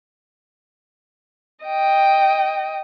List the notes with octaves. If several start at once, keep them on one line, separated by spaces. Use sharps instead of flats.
D#5 G5